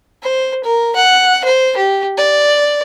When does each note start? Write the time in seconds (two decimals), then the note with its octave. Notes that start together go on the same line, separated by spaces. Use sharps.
0.23 C5
0.64 A#4
0.96 F#5
1.45 C5
1.77 G4
2.18 D5